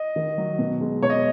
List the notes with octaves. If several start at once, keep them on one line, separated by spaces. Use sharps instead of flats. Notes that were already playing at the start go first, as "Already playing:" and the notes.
Already playing: D#5
D#3
F#3
B2
G#3
B2 C#5
D#5